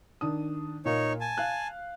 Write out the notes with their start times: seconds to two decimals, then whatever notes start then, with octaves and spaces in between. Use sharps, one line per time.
0.21 D#3 D4 D#6
0.85 A#2 A#3 D#4 C#5
1.21 G#5 A5
1.38 F5 F#6